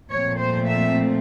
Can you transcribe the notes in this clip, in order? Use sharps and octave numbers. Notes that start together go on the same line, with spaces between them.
A#2 F3 A3 C4 C#5
C5
E5